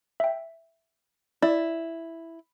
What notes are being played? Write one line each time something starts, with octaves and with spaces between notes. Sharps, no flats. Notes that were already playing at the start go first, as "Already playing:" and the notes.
E5 G5
E4 D5